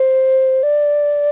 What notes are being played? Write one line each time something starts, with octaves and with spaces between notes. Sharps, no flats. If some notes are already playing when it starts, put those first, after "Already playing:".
Already playing: C5
D5